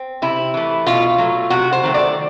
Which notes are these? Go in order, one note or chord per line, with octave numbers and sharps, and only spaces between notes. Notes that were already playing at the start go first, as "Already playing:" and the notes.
Already playing: C4
C3 E4
E3 A3
B2 F4
F#3 A3
C3 F#4
C5
D#3 F#3 A3
D5